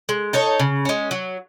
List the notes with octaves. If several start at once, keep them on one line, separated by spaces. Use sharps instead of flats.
G#3
D#4 A4 C#5
C#3
G#3 C#4
F#3